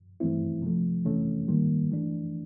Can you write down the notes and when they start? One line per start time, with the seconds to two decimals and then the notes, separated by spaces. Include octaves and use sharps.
0.20 G2 E3 A3 C4 E4
0.62 C3 F3 A3
1.05 F2 C3 E3 A3 C#4
1.48 G#2 D#3 G3 A#3
1.91 E3 A3 D4